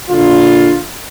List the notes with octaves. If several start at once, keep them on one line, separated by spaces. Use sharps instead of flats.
A#2 D3 F4